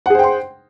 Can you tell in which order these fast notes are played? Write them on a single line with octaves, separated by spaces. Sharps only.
F#5 G#4 C5 G5 C6